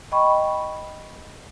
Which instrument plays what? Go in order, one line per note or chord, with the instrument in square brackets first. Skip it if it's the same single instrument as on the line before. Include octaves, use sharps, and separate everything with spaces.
[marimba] D#5 G5 B5 C#6